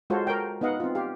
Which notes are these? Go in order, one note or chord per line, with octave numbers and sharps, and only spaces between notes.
G#3 F4 F#4 A4 C5 C#5
A#4 C#5 G5
B3 D#4 D#5 F5 F#5
C4 F4
G4 F5